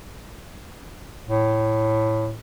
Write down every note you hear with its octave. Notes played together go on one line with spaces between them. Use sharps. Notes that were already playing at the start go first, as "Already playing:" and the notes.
A2